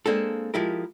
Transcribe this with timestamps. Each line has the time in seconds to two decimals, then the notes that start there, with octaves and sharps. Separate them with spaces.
0.06 G#3 A#3 C4 D4 A4
0.54 F3 G#3 E4 G4 A#4